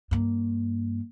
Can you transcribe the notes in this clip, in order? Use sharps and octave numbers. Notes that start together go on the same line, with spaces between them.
G2 A#3